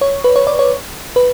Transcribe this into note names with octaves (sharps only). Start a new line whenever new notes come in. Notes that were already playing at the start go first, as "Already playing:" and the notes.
C#5
B4
C#5
D5
C#5
B4